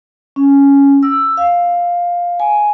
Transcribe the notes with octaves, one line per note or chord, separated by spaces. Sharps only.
C#4
E6
F5
G#5